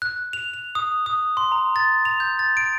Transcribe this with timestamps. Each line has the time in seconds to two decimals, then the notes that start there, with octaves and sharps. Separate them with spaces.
0.02 F#6
0.33 F7
0.54 F7
0.75 D#6
1.06 D#6
1.37 C6
1.52 A#5
1.76 A6
2.05 F7
2.20 G6
2.39 A6
2.57 D7